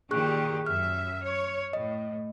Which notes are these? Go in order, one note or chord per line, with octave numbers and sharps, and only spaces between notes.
A#2 D#3 G4 G#4 C#6 F#6
F#2 E5 F6
C#5
A2 D#5